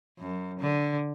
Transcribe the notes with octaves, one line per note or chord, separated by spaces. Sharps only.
F#2
D3